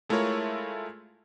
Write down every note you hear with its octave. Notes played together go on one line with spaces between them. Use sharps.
G#3 A3 E4 F4 A#4 C#5